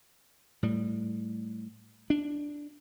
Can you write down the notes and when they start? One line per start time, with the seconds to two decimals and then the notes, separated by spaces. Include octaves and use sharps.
0.63 A2 G3
2.10 D4